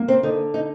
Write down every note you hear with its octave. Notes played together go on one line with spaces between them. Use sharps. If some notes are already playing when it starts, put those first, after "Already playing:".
Already playing: A#3
C4 C5
D3 D#4
D#4